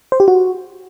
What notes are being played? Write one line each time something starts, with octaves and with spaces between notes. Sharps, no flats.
C5
G4
F#4